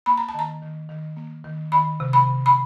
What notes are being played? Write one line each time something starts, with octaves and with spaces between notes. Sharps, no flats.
A#3 B5
A#5
A5
D#3 A#5
D#3
D#3
A#3
D#3
D#3 B5
C3
B5
C3
B5